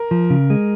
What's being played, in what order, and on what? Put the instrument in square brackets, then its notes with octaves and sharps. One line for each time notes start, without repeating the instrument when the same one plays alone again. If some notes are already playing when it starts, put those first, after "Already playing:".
Already playing: [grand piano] A#4
[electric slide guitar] F3
C#3
G#3